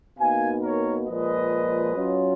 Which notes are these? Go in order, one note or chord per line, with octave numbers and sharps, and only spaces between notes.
B2 A#3 D#4 F5 G#5
A#4 C#5
A#2 F3 G#3 B4 D#5
F#3 C#4 F4